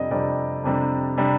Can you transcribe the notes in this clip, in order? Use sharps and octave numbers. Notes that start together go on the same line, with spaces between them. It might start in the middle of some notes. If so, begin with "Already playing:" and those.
Already playing: F2 C3 G3 D4 D5 D#5
F2 C3 G3 D4 D5
F2 C3 G3 D4
C3 G3 D4